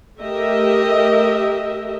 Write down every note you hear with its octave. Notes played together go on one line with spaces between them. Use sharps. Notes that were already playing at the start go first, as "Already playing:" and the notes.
A3 G4 A#4 D#5 E5